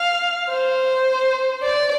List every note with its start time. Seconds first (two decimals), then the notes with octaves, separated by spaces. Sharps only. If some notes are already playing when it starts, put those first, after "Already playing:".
Already playing: F5
0.50 C5
1.63 D5